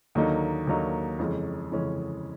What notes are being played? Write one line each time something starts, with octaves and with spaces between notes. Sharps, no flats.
D#2 D3 F#3 A#3 D#4
D#2 D3 F#3 A#3 D#4
F2 C#3 E3 G#3 C#4
F2 C#3 E3 G#3 C#4